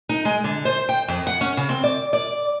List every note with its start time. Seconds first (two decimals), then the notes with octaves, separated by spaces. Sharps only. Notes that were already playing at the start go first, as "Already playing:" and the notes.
0.09 D#4
0.25 G#3
0.44 D3
0.65 C5
0.89 G5
1.08 F2
1.27 F#5
1.41 C#4
1.57 C#3
1.69 C4
1.84 D5
2.13 D5